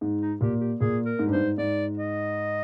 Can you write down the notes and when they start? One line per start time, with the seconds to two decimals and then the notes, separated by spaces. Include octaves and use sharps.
0.01 G#2
0.21 D#4
0.41 A#2 G4
0.60 G4
0.80 A#2 G#4
1.06 A#4
1.19 G#2
1.27 G2
1.32 G#2 C5
1.58 G#2 D5
1.97 D#5